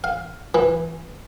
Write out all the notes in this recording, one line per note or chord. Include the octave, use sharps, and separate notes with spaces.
F5
E3